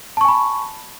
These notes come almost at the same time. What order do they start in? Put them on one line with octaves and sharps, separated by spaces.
A5 C#6 G#5 B5